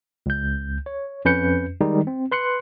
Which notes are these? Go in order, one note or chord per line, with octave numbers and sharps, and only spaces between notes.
C#2 G6
C#5
F2 C#4 B4 G6 C#7
D#3 G3 G#3 D#4
C4
B4 C6 F#6 C#7